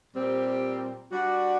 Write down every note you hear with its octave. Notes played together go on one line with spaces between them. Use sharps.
A#2 G3 C4 G4
G3 D4 F#4